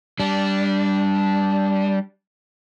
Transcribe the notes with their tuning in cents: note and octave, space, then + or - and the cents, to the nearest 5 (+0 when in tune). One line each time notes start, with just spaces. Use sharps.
G3 +0 D4 -10